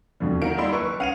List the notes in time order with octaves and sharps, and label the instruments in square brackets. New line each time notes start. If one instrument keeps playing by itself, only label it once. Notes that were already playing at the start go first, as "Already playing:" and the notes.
[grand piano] F2 B2 D3
[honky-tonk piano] D#3 D7 [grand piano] F5 F#5 A#5
[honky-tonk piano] G3 E4 C6 [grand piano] A#3 D#4
[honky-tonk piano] F#1 [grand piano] B4 C#6
[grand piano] C#4 D#7 F7 [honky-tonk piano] F5 F#5